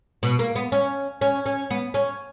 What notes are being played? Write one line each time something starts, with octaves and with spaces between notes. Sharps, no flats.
B2
A#3
B3
C#4
C#4
C#4
B3
C#4